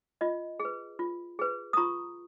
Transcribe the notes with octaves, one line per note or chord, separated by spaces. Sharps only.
F4 D#5
G#4
B4
F4
G#4 B4
D#6
F4 A#5 C#6